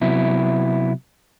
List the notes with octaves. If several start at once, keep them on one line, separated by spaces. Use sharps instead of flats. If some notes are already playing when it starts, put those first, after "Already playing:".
C3 F#3 B3 E4